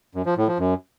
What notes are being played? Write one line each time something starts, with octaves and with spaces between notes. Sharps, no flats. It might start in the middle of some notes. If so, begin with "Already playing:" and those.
F#2
F3
A2
F3
F#2